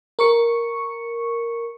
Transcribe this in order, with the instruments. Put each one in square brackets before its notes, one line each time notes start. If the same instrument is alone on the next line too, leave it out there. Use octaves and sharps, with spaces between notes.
[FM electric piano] A#4 C#6 C#7